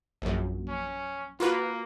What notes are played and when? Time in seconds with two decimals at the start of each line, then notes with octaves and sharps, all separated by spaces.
0.22 A#1 F#2
0.69 C#4
1.40 A#3 F4 F#4 B4